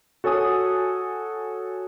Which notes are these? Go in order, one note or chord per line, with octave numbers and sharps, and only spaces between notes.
F#4 A4 C#5 G#5 D#6